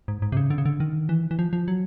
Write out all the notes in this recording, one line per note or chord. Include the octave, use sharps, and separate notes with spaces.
G#2
G#2
C3
C#3
D3
C#3
D3
D#3
E3
E3
F3
F3
F#3